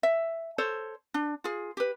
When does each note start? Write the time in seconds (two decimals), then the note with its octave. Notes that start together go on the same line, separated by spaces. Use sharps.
0.03 E5
0.58 A4 C5 C#5
1.14 D4
1.44 F4 G#4
1.77 G4 B4